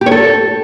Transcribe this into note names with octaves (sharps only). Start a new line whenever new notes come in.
G4
C#5
A4